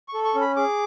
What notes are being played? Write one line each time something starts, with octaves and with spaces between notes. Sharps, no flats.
C#6
A4
C#6
C#4
B5
G#4 D6